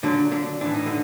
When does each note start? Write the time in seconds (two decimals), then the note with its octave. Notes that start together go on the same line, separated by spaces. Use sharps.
0.03 A#2 D3 F#3 D4
0.31 D3 D4
0.61 A2 E3 D4
0.75 D#4
0.86 D3 D4